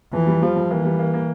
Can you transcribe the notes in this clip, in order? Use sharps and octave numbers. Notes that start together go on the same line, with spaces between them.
F2 E3
G3
F3 G3
F2
E3 A#3
G3
A#3
A#3